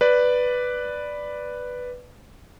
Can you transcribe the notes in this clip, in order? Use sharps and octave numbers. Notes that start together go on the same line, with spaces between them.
B4 D5